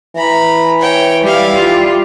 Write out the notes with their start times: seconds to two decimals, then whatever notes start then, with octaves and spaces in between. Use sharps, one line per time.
0.17 E3 A#5 B5
0.80 C#5 G5
1.23 G3 E4 F5
1.52 G3 F4